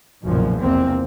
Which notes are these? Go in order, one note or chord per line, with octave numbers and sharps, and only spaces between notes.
F#1 B1 F#2 A#2 F3
F1 E2 A#3 C4